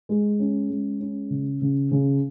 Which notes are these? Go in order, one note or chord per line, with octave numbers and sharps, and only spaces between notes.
G#3
C#4
G#3
C#4
C#3
C#3
C#3